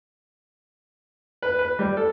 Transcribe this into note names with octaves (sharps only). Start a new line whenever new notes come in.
B4
B4
G3
A4